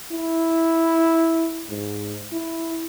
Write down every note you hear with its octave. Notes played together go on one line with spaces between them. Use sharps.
E4
G#2
E4